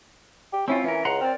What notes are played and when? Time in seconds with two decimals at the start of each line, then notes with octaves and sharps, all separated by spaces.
0.53 G4
0.68 C4 C#4 E4 F4
0.84 E3 C#4 A#4
1.05 C#2 F#5 A#5 C6
1.21 C4 A#4 D5